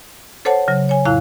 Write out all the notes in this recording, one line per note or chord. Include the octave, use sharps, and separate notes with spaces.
A4 C5 C#5 F#5 A5
C#3 F#3
C#5 G#5
F2 A2 E4 F5 F#6